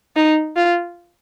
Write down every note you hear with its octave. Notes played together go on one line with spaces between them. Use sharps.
D#4
F4